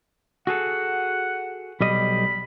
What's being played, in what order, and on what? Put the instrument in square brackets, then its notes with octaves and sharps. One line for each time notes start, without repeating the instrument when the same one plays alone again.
[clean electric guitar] F#4 G#4 A4 [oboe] F#5
[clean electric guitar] B1 G3 D#5 [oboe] B5